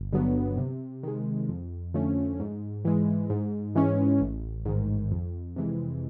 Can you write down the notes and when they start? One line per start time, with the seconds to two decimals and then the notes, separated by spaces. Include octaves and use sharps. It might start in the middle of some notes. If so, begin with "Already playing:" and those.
Already playing: G1
0.12 G2 D3 F#3 B3
0.57 C3
1.03 D#3 G#3
1.48 F2
1.94 D3 F3 A3 C#4
2.40 G#2
2.85 E3 G#3
3.30 G#2
3.75 E3 G#3 C#4
4.21 A1
4.66 G#2 D#3
5.11 F2
5.56 C3 E3 G#3